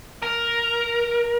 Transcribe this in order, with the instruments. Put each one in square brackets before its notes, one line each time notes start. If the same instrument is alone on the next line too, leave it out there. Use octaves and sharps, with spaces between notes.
[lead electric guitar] A#4